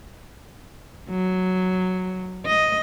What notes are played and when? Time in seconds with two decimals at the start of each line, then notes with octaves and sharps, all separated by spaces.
1.09 F#3
2.45 D#5